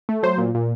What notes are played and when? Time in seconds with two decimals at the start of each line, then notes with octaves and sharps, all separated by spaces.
0.09 A3
0.23 F#3 C5
0.38 A#2
0.55 A#2